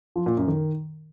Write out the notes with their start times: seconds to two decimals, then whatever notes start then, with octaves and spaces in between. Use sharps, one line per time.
0.16 F3
0.26 A#2
0.37 F#2
0.48 D#3